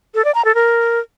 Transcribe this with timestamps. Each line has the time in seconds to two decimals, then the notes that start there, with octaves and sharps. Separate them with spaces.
0.15 A4
0.25 D5
0.35 A#5
0.45 A4
0.55 A#4